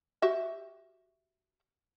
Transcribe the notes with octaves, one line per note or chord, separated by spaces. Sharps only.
F#4 G4 E5